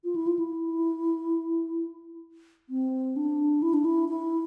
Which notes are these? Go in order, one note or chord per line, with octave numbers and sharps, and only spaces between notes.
F4
E4
F4
E4
C4
D4
E4
D4
E4
E4